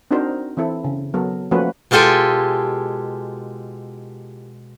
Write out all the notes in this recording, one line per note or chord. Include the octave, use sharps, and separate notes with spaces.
C4 D4 D#4 F#4 A#4 C5
E3 C4 E4 A4
C#3
F#3 B3 A4 A#4
F3 A3 A#3 C#4 F#4 B4
B2 G#3 F4 G4 A4 G#5